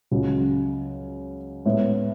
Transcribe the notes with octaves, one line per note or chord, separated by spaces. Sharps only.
C#2 C#3 F#3
A2 G#3 B3